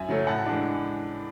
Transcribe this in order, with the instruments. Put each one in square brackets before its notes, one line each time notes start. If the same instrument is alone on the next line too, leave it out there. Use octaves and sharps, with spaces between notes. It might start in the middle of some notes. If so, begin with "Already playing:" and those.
Already playing: [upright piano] F#2 E5 G#5
C#3 F#3 A3 C#4
A2 F#5 A5
E3 G#3 D4